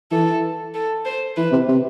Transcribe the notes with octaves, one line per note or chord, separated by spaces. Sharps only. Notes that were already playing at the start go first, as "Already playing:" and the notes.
E3 A4
A4
C5
E3 B4
C3
C3